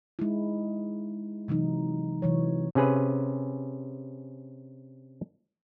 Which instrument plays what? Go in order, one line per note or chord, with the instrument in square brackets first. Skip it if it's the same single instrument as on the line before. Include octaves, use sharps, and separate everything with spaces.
[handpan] G#3 D#4 E4
C3 E3 F#3 D#4
C3 E3 F#3 C#5
[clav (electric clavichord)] C3 C#4 G#4 B4